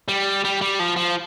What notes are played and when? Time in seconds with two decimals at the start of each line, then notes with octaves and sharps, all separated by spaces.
0.08 G3
0.45 G3
0.61 G3
0.79 F3
0.96 F3